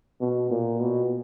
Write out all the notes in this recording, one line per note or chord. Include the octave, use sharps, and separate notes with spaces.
B2
A#2
B2